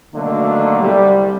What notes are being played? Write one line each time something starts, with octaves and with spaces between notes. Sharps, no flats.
B2 D3 D#3 F#3 A3 A#3
C2 G3